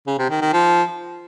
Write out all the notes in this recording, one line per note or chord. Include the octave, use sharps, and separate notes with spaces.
C#3
C3
D#3
D#3
F3